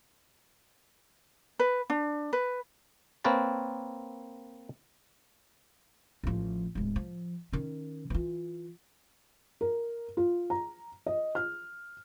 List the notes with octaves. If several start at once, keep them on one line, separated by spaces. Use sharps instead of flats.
B4
D4
B4
A#3 C4 A#4 B4 C#5 A5
A1 F3
D1 G#3
F3
D#3 C#4
E3 F4
A#4
F4
A#5
D#5
F6